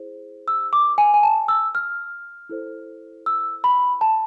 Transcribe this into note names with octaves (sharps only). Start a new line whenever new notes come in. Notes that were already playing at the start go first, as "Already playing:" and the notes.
Already playing: E4 G#4 C5
E6
D6
G#5
G#5
A5
E6
F6
E4 A4 C5
E6
B5
A5